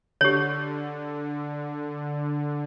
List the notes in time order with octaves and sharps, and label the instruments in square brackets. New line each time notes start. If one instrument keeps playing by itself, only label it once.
[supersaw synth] D3 [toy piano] G4 C#5